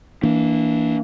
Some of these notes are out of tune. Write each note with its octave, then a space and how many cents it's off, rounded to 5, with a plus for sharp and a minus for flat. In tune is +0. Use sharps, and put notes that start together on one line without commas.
E3 -20 A#3 +0 D4 -15